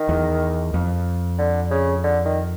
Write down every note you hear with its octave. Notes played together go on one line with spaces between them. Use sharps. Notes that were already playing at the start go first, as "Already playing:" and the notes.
Already playing: D#3
E2
F2
D3
C#3
D3
D#3